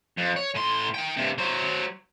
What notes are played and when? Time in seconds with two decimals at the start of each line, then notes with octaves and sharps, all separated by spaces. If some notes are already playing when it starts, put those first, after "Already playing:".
0.18 F2
0.36 C#5
0.55 A2 C6
0.94 D#4 G5
1.17 G2 C3
1.38 F#3 C5